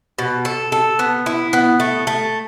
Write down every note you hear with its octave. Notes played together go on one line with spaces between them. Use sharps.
B2
A4
A4
B3
E4
B3
A3
A3